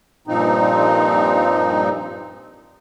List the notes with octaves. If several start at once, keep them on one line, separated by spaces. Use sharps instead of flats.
G2 A#2 F3 C4 D#4